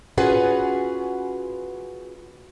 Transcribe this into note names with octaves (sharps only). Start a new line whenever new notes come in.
C#4 F4 F#4 G#4 B4 F#5